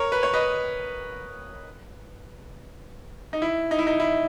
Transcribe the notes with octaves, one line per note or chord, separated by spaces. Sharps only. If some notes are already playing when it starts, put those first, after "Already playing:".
Already playing: A#4 C#5
B4
C#5
B4 D#5
D#4
E4
D#4
E4
D#4
E4